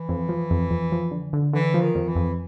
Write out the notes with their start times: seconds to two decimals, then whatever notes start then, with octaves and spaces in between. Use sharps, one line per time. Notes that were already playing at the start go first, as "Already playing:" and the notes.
Already playing: E3
0.09 F2
0.29 F3
0.51 F2
0.70 F2
0.92 F3
1.11 D3
1.33 D3
1.53 D3 E3
1.74 F3
1.80 D#3
1.95 F2
2.08 E3
2.16 F2